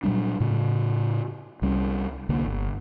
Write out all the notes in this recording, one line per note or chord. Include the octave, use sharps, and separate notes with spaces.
A#2 F#3 G3 D4
A2 C#3
C2 G3 C#4
C2 D3 A#3
G1